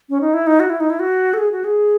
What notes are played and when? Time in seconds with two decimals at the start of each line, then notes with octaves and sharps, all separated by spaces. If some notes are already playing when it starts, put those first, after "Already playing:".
0.10 C#4
0.21 D#4
0.34 E4
0.47 D#4
0.60 F#4
0.70 E4
0.80 D#4
0.90 E4
1.00 F#4
1.34 A4
1.38 G#4
1.52 F#4
1.64 G#4